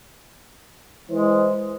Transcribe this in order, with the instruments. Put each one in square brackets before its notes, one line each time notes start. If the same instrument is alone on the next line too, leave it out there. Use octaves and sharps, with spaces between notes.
[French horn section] E3 E4 C5 [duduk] G#3